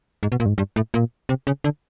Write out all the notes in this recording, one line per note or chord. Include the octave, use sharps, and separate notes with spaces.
G#2
B2
A#2
G2
G#2
G2
A2
A#2
C3
C#3
D3